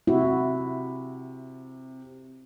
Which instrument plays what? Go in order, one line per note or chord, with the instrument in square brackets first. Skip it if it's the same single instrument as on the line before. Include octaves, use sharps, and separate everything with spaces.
[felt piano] C3 [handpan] E4 F#4